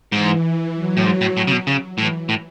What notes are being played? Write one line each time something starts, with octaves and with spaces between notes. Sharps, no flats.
G#2 E3
F#3
A2
G#2
A2
A2
C#3
B2
C#3
A2 E3
A2